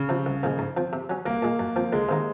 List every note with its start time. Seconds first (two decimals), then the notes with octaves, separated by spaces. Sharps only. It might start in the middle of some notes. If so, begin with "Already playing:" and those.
Already playing: C#3
0.09 C3 F3
0.26 C2
0.43 A#2 F3 G#3
0.59 G#2
0.77 F3 C4
0.93 C3
1.09 F#3 C#4
1.26 C2 A#3
1.42 A#2 G#3
1.59 F#2
1.76 F3 C4
1.93 C#2 G#3
2.09 C3 D#3 A#3